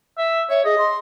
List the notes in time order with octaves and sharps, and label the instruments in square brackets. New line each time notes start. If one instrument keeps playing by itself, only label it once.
[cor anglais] E5
[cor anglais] C#5 [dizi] E5
[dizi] G#4 [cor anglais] D#5
[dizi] C6